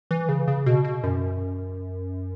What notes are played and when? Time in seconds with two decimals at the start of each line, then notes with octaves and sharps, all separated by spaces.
0.11 E3
0.29 C#3
0.47 C#3
0.66 B2
0.84 B2
1.04 F#2